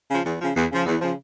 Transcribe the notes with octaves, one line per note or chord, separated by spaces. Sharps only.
C#3 F3
E2
C#3 F3
E2
C#3 F3
E2
C#3 F3